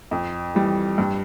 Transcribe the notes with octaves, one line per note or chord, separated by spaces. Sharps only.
F2
E3 G3
G2